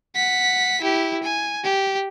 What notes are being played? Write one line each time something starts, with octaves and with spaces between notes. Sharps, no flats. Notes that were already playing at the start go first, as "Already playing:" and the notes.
F#5 B6
E4 G4
G#5
G4